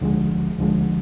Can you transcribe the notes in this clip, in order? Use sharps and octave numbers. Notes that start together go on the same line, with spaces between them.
D2 D3 F3 G#3
D2 D3 F3 G#3